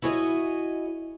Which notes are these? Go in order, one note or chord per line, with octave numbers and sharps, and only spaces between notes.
E4 F#4 G#4 C5 C#5 D#5